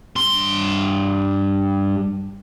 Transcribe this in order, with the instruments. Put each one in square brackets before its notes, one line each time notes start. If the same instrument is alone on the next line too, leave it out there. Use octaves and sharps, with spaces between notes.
[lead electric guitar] G2 C6